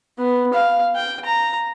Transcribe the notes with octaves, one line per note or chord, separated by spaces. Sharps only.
B3
F5
G5
A#5